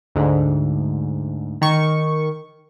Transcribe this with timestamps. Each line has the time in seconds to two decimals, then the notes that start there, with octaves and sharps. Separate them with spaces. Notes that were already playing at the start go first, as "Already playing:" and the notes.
0.15 D2 G#2
1.61 D#3 C#6